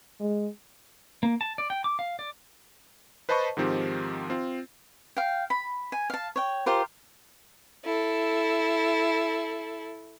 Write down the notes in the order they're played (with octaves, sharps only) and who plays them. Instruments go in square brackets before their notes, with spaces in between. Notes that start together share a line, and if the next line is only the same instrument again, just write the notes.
[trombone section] G#3
[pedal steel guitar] A#3
A5
D5
G5
D6
F5
D5
[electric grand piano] B4 C5 D#5 A5 B5 C#6
G#2 D#3 F3 C4 G4
C4 F4
[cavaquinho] F5 G5
B5
G#5
F5 A5
C#5 G5
F4 G4 A#4 C5
[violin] E4 A4